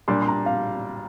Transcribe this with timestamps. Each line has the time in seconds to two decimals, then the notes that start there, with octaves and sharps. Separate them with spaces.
0.08 A#2 G3 D4 G4 C6
0.22 C6
0.28 A#5
0.46 F5